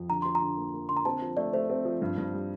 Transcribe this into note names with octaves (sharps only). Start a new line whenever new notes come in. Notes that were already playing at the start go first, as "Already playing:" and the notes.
Already playing: F2
D3 A#5
F3 C6
A#5
D3
A#3
A#3
D3 C6
A#5
C4 A5
F3
A3 D5
A3 C5
C4
F3
G2
G2
G3